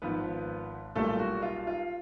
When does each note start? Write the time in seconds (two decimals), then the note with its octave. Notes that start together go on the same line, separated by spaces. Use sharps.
0.02 G#1 G#2 F3 B3 B4
0.95 B1 A#2 G3 A3 A4
1.19 F#4
1.42 F4
1.67 F4